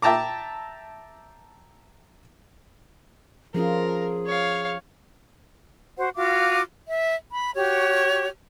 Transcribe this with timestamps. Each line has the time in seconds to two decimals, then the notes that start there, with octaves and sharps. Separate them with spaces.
0.02 E5 G5 A5 A#5 D6
3.54 F3 C#4 F4 G#4 A#4
4.26 C#5 F5
5.98 F#4 C5 F#5
6.15 F4 F#4 F5 D6
6.89 E5
7.31 B5
7.55 F#4 G4 C#5